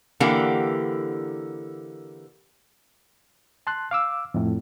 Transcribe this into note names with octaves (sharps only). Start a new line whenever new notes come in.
D3 E3 A#3 G4 F#5
A5 C6 F#6
F5 D6 E6
F2 A2